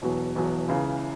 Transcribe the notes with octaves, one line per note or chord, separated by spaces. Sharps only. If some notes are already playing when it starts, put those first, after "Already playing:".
E1 E2 B2 F#3
E1 E2 B2 F#3
C#2 C#3 E3